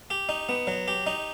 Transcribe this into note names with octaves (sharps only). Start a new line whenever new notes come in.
G4
D#4
B3
F#3
G4
D#4